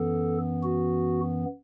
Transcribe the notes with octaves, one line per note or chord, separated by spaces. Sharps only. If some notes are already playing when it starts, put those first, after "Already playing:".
Already playing: F#2 E3 B3 A4
F#4